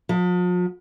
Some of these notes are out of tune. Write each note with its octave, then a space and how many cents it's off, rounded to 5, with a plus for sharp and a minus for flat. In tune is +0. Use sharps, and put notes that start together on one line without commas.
F3 +45